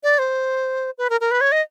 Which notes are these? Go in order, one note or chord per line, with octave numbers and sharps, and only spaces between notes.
D5
C5
B4
A#4
A#4
B4
C#5
D#5